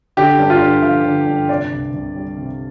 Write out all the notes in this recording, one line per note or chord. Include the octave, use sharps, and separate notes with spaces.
D3 G4
G2
F4
G2
F3 F5
D3
G2
C3 D5
C2
C2
G3
C3